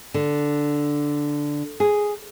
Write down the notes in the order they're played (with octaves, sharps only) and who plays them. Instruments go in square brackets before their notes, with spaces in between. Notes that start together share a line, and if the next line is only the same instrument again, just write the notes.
[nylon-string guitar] D3
G#4